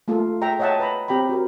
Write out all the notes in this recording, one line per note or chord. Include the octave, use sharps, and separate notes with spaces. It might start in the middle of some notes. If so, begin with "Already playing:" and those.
A3 A#3 F4 A4
G#4 E5 G5 A#5
C#5 D#5 E5 F#5 G5 A5
B4 A#5 B5
C4 G4 G5 A#5 B5
F#4 A#4